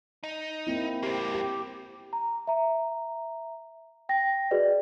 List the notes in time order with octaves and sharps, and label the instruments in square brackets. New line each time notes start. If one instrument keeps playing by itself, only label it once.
[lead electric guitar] D#4
[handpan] A#3 C4 E4
[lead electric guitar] A#3 C4 [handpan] G4
[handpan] G4
[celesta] A#5
E5 A#5
G5 A#6
F#4 G#4 B4 D5 D#5